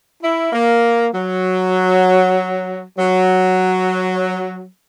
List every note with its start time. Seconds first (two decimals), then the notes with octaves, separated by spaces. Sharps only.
0.22 E4
0.53 A#3
1.15 F#3
2.99 F#3